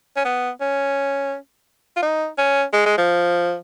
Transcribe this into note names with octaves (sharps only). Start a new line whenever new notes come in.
C#4
B3
C#4
F4
D#4
C#4
G#3
G#3
F3